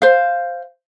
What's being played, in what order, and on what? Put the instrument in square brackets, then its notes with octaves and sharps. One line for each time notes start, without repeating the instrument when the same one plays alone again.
[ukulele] C5 F5